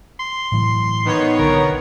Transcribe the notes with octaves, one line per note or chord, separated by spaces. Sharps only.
C6
A2 E3 F#3
D#3 B3 C#5
B1 D3 A#4